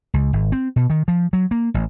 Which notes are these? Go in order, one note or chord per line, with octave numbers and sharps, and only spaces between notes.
C#2
G#1
C4
B2
D#3
F3
F#3
A#3
A1